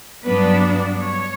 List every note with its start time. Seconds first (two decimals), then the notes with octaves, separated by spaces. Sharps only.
0.25 G2 F#3 B3 D4 B4
1.01 C#5